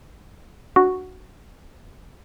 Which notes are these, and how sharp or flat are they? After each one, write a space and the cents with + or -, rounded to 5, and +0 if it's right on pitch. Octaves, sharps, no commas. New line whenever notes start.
D4 +0 F#4 +0